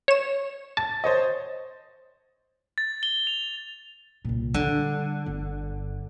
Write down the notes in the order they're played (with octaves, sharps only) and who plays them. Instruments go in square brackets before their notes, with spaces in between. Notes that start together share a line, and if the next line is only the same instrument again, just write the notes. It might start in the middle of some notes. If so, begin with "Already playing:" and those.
[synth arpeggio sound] C#5 E7
[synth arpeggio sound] A5 [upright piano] A6
[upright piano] C5 C#5 D#5
[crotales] A6
G7
F7
[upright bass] C2 A#2
[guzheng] D3 [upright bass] G3
[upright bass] G1